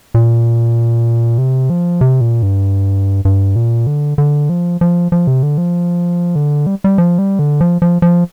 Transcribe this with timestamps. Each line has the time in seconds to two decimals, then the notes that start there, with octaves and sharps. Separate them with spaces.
0.14 A#2
1.38 C3
1.70 F3
2.01 C3
2.21 A#2
2.42 G2
3.25 G2
3.56 A#2
3.87 D3
4.18 D3
4.49 F3
4.81 F3
5.12 F3
5.27 C3
5.43 D3
5.58 F3
6.36 D3
6.67 G3
6.84 G3
6.98 F3
7.19 G3
7.39 D3
7.61 F3
7.82 F3
8.02 F3